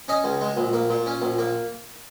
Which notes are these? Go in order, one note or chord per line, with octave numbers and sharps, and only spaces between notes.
C#4 D#5 G#5
C#2
G#3
A#1
A#3
A#2
C#4
A#1
A#3